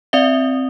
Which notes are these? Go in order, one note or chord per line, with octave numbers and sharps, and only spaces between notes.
C4 D5 E5